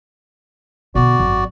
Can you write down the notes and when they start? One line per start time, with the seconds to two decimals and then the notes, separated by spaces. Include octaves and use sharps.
0.95 B2 D3 F#4 D5
1.19 G#1 F#2